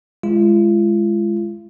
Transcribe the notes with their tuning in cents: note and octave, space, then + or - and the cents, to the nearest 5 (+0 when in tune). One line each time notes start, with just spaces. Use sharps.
G#3 +0 F4 -40